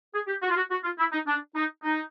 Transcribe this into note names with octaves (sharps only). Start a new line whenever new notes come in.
G#4
G4
F#4
F4
F#4
F#4
F4
E4
D#4
D4
D#4
D#4